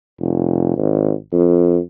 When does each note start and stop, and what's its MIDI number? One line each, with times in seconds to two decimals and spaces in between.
0.21 0.74 29
0.77 1.14 32
1.32 1.78 41